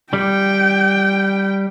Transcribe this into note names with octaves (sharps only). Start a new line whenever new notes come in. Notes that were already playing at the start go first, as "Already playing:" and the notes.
G3 G5